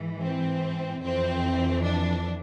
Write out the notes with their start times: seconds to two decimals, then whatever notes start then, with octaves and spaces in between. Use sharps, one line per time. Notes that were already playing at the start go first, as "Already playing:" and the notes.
Already playing: G#2 E3
0.21 C4
1.02 F2 E3 C4
1.84 D4